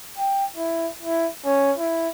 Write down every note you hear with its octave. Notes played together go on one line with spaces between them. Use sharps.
G5
E4
E4
C#4
E4